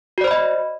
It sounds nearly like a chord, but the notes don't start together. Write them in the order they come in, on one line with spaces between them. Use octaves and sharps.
F#4 D5 C5 B5 D#5